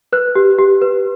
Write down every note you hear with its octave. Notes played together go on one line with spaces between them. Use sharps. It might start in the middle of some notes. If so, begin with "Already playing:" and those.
B4 F#6
G4
G4
B4